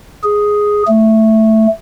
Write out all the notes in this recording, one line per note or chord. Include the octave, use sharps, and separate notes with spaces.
G#4
A3